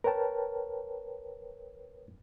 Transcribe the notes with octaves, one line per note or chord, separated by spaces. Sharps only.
A#4 B4 C#5 G5 A5